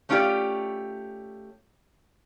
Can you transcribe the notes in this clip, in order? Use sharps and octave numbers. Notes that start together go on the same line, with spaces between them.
A3 C#4 D4 F4 G4 D5